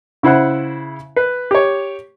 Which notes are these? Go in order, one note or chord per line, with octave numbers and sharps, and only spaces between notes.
C#3 E4 C5 F#5 F#6
B4
G4 C#5